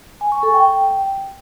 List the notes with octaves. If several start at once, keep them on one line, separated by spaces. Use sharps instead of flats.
G#5
C#6
A4
G5